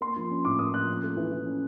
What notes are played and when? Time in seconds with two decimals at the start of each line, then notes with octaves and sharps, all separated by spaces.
0.01 A#3 C6
0.16 F3
0.30 C#4
0.45 A2 D6
0.59 A#3 D#6
0.74 F3 F#6
0.88 C#4
1.04 A3
1.17 E3
1.32 E3
1.46 C#4